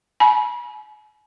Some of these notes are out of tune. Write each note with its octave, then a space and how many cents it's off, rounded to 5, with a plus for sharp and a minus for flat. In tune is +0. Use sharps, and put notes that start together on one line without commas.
G#5 +40 B5 -30